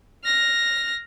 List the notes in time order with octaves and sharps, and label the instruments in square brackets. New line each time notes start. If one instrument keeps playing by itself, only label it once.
[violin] F6 A#6